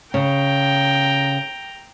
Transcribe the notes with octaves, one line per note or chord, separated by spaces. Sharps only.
C#3 G5 A#5